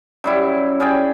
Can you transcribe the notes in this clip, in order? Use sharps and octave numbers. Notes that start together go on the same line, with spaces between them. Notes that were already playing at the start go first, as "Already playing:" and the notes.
F#2 G3 E4
C#4 G#4 D5 G5